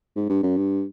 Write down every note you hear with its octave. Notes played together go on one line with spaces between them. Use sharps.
G#2
G2
F#2
G2